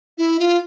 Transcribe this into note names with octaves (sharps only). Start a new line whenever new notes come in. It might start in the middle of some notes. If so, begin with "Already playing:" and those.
E4
F4